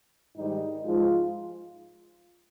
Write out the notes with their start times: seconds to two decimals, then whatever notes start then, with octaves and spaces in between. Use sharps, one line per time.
0.35 G#2 D#3 G3 D#4
0.83 G#2 F3 G#3 F4